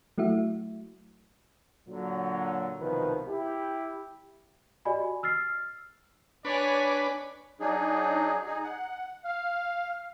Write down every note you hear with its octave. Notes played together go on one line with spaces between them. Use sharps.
F#3 A3 E4 F#4 E5
A#2 D3 F#3
C2 B2 D#3 F3 B4
E4 G4
F#4 G4 D5 D#5 G#5 B5
E6 F6 A6 C7
D4 B4 C#5 D5 G#5
F#3 D4 D#4 G#4
D#4 G#4
F#5
F5